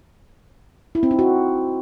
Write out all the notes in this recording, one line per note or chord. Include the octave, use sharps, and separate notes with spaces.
E4
C4
D#4
F#4